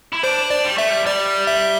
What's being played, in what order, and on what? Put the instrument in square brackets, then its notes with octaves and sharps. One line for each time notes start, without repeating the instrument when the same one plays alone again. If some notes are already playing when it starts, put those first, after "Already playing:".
[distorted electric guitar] E4
[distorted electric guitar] D4 [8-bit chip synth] C5
[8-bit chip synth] D5
[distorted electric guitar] G3
[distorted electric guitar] A3 [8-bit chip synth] E5
[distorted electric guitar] G3
[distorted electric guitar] G3 [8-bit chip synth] D5
[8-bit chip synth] E5